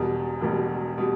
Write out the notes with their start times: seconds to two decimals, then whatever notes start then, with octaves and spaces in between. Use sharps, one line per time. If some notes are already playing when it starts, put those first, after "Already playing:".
Already playing: E1 E2 B2 G3
0.41 E1 E2 B2 G3
0.98 B2 G3